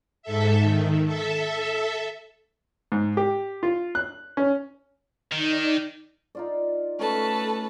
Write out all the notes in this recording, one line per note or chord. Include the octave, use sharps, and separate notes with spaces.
G#2 A4 E5
D#3
A4 E5
G#2
G4
F4
F#6
C#4
D#3 D#4 D5
D#4 F4 D5
A3 C#4 A4 B4 A5